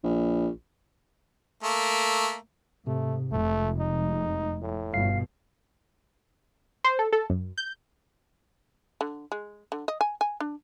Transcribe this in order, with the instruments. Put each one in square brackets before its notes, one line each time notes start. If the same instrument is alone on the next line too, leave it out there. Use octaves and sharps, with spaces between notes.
[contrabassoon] A#1
[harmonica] A3 A#3
[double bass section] G#2 [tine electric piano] C3 [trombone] A3
[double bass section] F1 G#3 [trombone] A3
[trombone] D#4
A2
[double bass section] G1 B2 [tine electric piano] F5 C7
[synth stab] C5
A4
A4
F#2
G6
[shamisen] D3
G#3
D3
D#5
G#5
G#5
D4